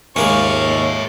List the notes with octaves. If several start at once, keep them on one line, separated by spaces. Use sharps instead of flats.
D#2 G#3 A#3 C#4 C#5 E5 F5 C#6